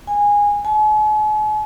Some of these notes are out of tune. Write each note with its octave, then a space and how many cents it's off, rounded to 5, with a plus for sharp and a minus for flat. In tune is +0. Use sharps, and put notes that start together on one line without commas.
G#5 -15
G#5 +45